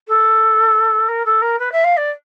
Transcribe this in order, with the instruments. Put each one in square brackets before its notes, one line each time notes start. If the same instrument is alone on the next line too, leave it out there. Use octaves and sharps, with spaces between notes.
[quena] A4
A#4
A4
A#4
B4
E5
F5
D5